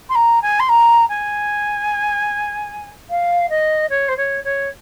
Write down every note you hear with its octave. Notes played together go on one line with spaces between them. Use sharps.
C6
A#5
G#5
C6
A#5
G#5
F5
D#5
C#5
C5
C#5
C#5